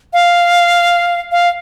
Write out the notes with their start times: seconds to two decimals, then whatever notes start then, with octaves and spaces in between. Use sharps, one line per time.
0.13 F5
1.31 F5